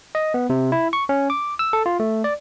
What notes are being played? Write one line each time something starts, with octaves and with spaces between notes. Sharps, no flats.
D#5
B3
C3
E4
C#6
C#4
D6
E6
A4
F4
A3
D5